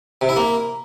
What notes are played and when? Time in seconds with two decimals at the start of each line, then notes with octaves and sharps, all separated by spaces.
0.21 C3
0.29 E4
0.36 A#3